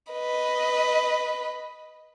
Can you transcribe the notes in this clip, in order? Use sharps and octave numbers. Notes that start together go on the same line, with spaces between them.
B4 D#5